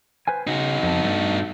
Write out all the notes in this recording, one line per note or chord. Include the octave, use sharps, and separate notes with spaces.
B4 C5 G#5
C#3 D#4 F#4
F2 A5
G2 A3